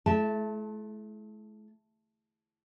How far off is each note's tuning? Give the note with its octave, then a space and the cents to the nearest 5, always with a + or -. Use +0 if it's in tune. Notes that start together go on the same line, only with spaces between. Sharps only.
A3 -45 E4 +5 A5 +0